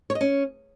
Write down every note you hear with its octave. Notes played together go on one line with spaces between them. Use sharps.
C#5
D#5
C#4